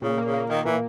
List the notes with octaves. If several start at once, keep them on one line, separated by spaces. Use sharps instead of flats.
A#2 C#3
A#3
C#3
A#3
D#3 A#3
A#2 E3